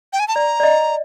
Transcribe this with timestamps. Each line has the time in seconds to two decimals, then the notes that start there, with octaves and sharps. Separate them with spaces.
0.13 G5
0.20 G#5
0.28 A5
0.35 D5 A#5
0.60 D5
0.63 D#5